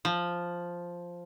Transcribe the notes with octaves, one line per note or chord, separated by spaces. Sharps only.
F3